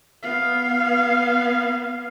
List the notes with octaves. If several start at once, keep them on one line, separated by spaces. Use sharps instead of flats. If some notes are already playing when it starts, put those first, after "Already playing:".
B3 F5